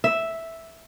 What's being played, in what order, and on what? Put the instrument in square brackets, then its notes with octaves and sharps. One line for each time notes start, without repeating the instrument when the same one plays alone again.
[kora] E5